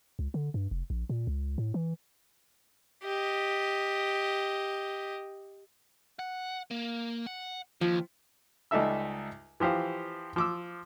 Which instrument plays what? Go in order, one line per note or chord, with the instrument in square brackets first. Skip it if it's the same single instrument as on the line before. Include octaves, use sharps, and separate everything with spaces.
[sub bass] C#2
D3
G2
F1
A#1
A#2
C#2
A2
E3
[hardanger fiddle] G4 D#5
[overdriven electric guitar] F#5
A#3
F#5
[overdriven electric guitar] D#2 [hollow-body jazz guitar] F3
[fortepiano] C#2 G3 D#4 A4 E5 E6
E3 F3 G4 C5 F5
F3 D6 E6